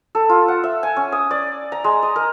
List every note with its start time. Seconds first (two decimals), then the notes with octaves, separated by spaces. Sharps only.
0.15 A4
0.29 F4
0.48 F#5
0.64 E5
0.83 G#5
0.97 C#4
1.12 D#6
1.31 D5
1.72 A#5
1.84 G#3
2.03 D#5
2.16 A#4